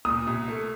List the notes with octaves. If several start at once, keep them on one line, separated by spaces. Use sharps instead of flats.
A#2 D#6
C2
A3